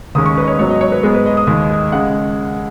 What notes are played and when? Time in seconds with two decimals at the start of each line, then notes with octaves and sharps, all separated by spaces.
0.15 D#2 D#3 G#3 C#4 D#6
0.26 C#6
0.38 B4 D#5
0.47 C#5
0.58 G#2 F#3 B3 C#5
0.70 D#5
0.81 C#5
0.92 B4
1.03 G#2 G#3 B3 G#4
1.14 B4
1.26 D#5
1.37 D#6
1.47 D#2 D#3 G#3
1.92 C#3 G#3 F#5